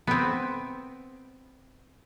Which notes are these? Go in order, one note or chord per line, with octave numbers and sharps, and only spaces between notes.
B3 C4